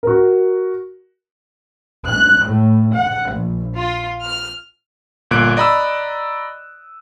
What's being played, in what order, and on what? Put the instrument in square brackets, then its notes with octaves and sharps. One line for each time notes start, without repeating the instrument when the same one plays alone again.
[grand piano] F#4 A#4
[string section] F#6
A2
F#5
A#1
F4
F6
[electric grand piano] G1 A#2 F#6 D7
D5 D#5 A#5 B5 D#6 E6